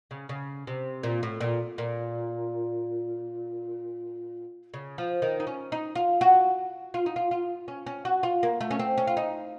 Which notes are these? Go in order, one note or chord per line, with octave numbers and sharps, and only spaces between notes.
C#3
C#3
C3
A#2
A2
A#2
A#2
C#3
F3
D#3
D#4
C#4
D#4
F4
F#4
F4
D#4
F4
F4
C#4
C#4
F#4
F4
A#3
A3
C#4
C4
C#4
F4
D#4